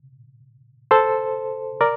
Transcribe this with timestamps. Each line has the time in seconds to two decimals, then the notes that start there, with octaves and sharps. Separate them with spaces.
0.91 A4 C5
1.81 A#4 D5